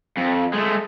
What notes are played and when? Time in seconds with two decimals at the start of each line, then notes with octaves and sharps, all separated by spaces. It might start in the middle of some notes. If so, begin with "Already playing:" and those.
0.17 F2
0.53 G#3 A3